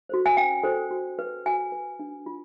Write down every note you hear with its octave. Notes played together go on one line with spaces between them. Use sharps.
F#4 A4 C5
G#5
C#4 G5
F#4 A4 C5
F#4
B4
F#4 G#5
B4
D4
F4